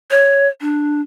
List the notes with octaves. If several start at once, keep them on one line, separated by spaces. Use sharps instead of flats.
C#5
D4